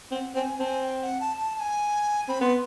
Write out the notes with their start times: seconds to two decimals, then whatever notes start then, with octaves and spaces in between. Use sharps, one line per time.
0.11 C4 G5
0.15 F#5
0.35 C4 G#5
0.60 C4 A5
0.65 G#5
0.83 G5
1.02 F#5
1.20 A5
1.37 A5
1.56 A5
1.60 G#5
2.29 C4 B5
2.42 B3 C6